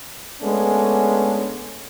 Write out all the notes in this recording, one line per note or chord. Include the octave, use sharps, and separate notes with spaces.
G#3 A3 B3 C#4 D4